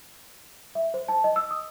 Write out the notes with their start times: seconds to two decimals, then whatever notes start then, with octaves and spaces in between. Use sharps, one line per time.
0.75 E5
0.94 C5
1.08 A5
1.24 D#5
1.36 E6
1.51 D#6